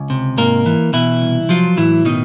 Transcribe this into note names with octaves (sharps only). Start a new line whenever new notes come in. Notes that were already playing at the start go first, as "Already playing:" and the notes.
Already playing: C#2
C3
G#2 A#3 A#4
E3
B2 E3 E4
C2
F3 F#3 F4
A2 E3 E4
B2 D#3 D#4